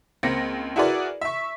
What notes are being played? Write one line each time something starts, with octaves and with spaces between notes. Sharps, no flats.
C#2 A#3 C4 A#6 C#7
E4 F#4 G#4 A#4 B4 D5
E5 C#6